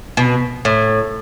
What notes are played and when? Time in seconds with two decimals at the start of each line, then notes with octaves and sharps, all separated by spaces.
0.17 B2
0.65 A2